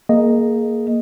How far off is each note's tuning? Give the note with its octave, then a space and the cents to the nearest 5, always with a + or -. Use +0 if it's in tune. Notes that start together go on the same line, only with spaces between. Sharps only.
A#3 +0 G#4 +20 D#5 +0